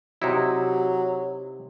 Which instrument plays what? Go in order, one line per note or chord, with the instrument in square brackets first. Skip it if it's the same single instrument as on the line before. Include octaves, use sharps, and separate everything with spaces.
[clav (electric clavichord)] C3 D#4 E4 [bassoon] F#3